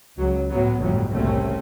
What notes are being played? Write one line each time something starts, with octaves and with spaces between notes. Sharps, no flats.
C#2 F#3
A2 F#3 B3
G1 F2 A2 F#3 G3
F#1 C2 A2 A3 C4 C#4